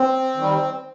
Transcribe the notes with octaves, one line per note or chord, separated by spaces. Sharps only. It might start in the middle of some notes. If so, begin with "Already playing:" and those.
Already playing: C4
D#3 G3